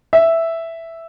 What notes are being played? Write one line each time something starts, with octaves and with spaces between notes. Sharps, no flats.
E5